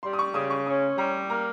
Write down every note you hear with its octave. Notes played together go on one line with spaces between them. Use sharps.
G3 C6
D#6
C#6
C#3 D#6
C#6
C#4 D#6
G3 A#5
A#3 A#5